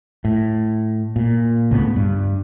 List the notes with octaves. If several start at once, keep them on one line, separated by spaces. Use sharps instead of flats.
A2
A#2
C#2 A2 B3
G2